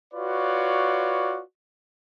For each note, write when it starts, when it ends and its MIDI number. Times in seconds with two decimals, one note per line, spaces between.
0.14 1.41 65
0.14 1.41 66
0.14 1.41 71
0.14 1.41 73
0.14 1.41 74